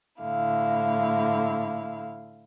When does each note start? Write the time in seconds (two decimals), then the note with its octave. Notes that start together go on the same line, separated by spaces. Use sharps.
0.22 A2 D3 E4 F5